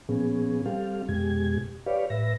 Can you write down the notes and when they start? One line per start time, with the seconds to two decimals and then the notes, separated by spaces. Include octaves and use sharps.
0.09 A#2 F3 B3 C#4 G#4
0.66 G3 C4 G4 A4 F5
1.09 F2 B2 G#3 G4 G#6
1.86 G4 B4 C#5 D5 F5
2.10 A2 B4 E5 A#6